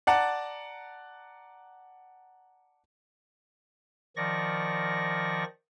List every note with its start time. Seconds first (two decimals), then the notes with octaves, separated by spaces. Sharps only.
0.07 D5 F#5 A5 A#5
4.16 D#3 F3 D5 C#6 A#6